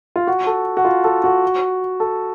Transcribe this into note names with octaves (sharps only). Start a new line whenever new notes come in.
F4
F#4
A4
F#4
F4
A4
F#4
A4